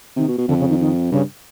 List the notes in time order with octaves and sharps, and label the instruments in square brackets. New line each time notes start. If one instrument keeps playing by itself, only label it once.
[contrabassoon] C3 [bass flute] D#3
[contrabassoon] B2
B2
[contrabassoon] F2 [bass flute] D3
[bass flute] C#3
D#3
D#3
[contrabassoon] G2 [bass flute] C#3